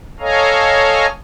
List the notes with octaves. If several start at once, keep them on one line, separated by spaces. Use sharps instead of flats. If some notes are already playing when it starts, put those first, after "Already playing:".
A4 C#5 D#5 F5 G#5 A#5